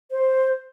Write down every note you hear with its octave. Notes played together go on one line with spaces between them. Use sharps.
C5